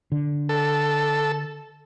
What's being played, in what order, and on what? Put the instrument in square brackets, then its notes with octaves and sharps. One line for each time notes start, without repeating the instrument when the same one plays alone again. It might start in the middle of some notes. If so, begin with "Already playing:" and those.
[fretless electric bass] D3
[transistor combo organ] A4